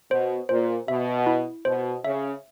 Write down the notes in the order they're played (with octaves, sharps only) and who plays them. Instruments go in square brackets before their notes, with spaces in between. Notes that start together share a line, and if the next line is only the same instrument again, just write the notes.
[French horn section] B2 [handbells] C5
[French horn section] A#2 [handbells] C5
[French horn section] B2 [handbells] E5
[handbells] E4
[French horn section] B2 [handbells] C5
[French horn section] C#3 [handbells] E5